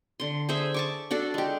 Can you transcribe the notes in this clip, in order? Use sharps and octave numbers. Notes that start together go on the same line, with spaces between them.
D3 C6
G#4 C5 E5
A5 C#6 D6
D4 F#4 A4
G#3 G4